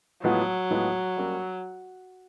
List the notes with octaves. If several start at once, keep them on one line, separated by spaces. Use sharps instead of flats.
A2 F3 F#3 G#3 B3
A2 F3 G#3 B3
G3 A#3 C#4